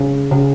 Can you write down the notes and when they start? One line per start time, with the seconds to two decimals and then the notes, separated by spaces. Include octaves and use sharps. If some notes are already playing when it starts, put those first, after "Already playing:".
Already playing: C#3
0.32 C#3